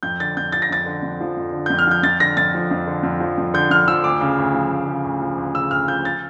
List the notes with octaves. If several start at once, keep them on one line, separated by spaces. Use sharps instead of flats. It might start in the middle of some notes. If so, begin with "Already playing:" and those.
F2 G6
D3 A6
F2 G6
F3 A6
A#6
F2 A6
D3
F2
F3
F2
D3
F2 G6
F6
F3 G6
F2 A6
D3 A#6
F2 A6
F3
F2
D3
F2
F3
F2
D3 G6
F2 F6
F3 E6
D2 D6
C#3
D2
F3
D2
C#3
D2
F3
D2
C#3 E6
D2 F6
F3 G6
A6